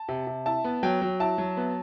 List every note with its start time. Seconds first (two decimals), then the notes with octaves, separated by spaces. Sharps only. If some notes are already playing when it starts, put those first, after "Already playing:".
Already playing: A5
0.08 C3
0.27 C3
0.46 E4 A5
0.64 B3
0.83 F#3 G5
1.02 F#3
1.20 E4 A5
1.38 F#3
1.57 B3